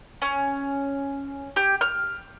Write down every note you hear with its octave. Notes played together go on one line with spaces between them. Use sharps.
C#4
G4
F6